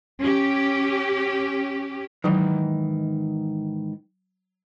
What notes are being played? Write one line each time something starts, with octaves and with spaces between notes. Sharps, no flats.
C#4 G4
G#2 D#3 E3 F#3